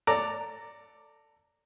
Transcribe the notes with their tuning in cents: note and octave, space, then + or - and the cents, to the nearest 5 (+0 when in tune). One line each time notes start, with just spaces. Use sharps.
A4 +15 D5 +0 A#5 -10